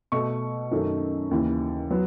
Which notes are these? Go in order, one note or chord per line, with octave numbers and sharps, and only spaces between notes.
B2 A3 C#6
F#2 D#3 A3
D#2 C#3 E3
F#3 B3